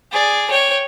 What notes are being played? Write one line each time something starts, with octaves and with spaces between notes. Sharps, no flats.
G#4 D5
C#5 G5